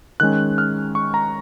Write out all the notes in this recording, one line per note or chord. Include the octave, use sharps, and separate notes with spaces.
D#3 G#3 C#4 F#6
F6
C#6
A#5